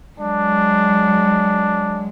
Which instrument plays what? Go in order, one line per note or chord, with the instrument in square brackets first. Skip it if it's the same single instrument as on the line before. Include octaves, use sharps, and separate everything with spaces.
[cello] F#3 G#3 [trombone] D4